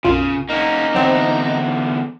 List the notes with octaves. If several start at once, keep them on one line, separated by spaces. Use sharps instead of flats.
B1 F#2 C#3 F4
A#3 C#4 D#4
E2 D3 F#3 C4